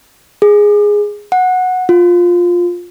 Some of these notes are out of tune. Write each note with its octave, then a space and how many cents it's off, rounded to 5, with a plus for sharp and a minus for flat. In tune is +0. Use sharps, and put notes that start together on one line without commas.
G#4 -5
F#5 -10
F4 +10